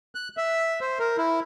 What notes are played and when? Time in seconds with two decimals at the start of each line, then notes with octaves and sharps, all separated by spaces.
0.15 F#6
0.37 E5
0.81 C5
0.99 A#4
1.17 E4